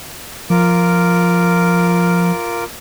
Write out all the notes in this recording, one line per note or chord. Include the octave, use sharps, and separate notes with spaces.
F3 F4 A#4 D6